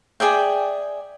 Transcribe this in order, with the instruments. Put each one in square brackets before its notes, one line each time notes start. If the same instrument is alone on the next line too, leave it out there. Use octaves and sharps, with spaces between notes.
[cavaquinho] G#4 D5 E5 G5